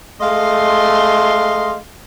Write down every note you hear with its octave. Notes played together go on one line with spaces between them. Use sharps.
G#3 A3 D#5 F5 C6